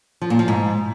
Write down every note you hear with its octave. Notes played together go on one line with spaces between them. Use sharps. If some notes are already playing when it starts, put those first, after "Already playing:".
F3
A#2
F3
G#2